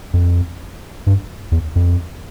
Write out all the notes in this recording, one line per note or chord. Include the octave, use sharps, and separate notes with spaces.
F2
G2
E2
F2